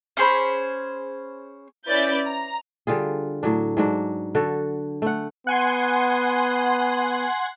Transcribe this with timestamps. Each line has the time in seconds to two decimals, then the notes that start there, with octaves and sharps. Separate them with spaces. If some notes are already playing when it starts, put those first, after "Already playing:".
0.17 C#4 G#4 C5 B5
1.88 C#4 E4 B4 D5 G6 A6
2.25 A#5
2.87 D3 G3 F4 G#4
3.43 A2 F#3 D4
3.77 G#2 F#3 D4
4.35 D3 F#4 A4
5.02 A3 F#5
5.47 B3 F#5 G#5 C6